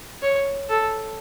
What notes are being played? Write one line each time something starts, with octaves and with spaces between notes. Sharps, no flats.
C#5
A4